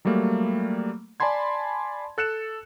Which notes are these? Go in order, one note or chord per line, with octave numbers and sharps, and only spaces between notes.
F#3 G3 A3 A#3
D5 G#5 A5 B5 C6 G#6
A4 F#6 C#7 E7